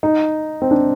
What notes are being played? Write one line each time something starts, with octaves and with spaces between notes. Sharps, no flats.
D#4
C4
D4